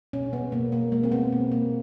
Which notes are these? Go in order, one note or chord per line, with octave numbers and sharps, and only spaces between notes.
B2 C#4
B3
B2 A#3
A#3
G#3 A#3
C4
B3
B2 B3
A#3